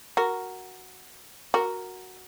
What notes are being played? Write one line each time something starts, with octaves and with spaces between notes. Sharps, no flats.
F#4 A#4
F#4 A#4